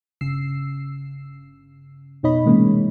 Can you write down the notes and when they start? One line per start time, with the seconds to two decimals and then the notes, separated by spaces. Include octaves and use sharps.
0.21 G1 C#3 E6 C7
2.23 F2 B2 D#4 C#5 D#5 B5
2.44 A2 C3 E3 G#3 A#3 C#4